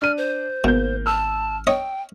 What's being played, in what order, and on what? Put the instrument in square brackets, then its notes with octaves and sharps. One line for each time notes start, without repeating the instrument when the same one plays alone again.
[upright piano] D4 D#7 [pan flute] F6
[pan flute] C5
[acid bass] G#1 [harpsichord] B2 [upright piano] A#3 G6
[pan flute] A5 [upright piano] E6 F6
[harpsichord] C#5 D#5 [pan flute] G5